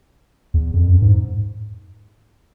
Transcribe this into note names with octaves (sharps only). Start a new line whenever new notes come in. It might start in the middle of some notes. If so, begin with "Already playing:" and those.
E2
F2
F#2
G#2